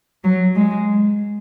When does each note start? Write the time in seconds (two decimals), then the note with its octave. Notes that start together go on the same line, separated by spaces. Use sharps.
0.24 F#3
0.55 G#3